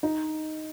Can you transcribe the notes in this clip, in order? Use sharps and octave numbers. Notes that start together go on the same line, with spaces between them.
D#4